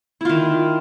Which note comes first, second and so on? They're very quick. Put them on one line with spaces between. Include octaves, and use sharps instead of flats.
E4 F4 D#3